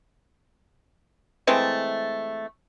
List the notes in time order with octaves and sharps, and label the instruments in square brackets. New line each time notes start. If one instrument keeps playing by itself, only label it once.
[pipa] E3 G#3 A3 C4